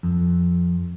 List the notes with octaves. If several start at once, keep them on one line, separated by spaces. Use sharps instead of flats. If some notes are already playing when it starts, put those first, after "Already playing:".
F2